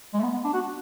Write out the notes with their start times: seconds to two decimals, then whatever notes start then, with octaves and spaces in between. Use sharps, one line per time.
0.14 G#3
0.20 A3
0.23 B3
0.34 B3
0.44 D4
0.53 F#4